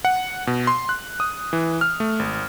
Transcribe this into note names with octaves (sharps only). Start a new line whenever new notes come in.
F#5
B2
C6
F#6
D#6
E3
F6
A3
G#1